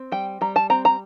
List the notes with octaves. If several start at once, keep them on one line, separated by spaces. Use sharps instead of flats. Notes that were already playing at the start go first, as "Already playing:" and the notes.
Already playing: C4
G3 G5
G3 A#5
A5
C4 A#5
A#5